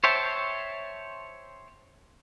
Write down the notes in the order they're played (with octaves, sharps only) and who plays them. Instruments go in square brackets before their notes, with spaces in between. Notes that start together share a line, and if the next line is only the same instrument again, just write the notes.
[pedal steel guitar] C5 C#5 E5 G5 A5